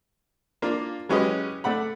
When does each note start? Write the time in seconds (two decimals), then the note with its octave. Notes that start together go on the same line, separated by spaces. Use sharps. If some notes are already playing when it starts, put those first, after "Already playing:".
0.62 A#3 D4 F4
1.09 F#3 G#3 C#4 G4 B4 D#5
1.64 A3 D5 F#5 B5